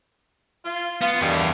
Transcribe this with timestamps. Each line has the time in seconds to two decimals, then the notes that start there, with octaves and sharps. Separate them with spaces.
0.65 F4
1.01 B3 F4
1.20 E2 G2 D#3 G3